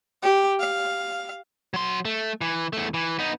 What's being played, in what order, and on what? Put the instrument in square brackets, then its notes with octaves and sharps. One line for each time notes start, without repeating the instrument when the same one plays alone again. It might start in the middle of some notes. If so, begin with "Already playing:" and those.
[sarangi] G4
F5
[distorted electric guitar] F#3 C6
A3
E3
E2 A3
E3
B3 D#4